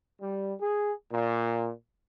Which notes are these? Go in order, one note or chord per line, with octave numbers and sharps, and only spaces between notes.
G3
G#4
A#2